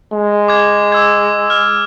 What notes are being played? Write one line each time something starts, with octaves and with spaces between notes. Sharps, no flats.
G#3
D6 G#6
D6 E6 G#6
F6